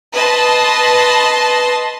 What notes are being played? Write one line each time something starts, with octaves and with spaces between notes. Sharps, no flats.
B4 D#5 A5 C6